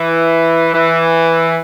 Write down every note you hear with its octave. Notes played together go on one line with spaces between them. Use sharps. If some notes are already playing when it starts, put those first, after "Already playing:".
Already playing: E3
E3